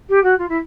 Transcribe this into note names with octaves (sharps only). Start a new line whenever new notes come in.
G4
F#4
F4
E4